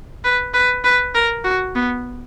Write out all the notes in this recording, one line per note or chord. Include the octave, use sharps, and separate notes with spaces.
B4
B4
B4
A#4
F#4
B3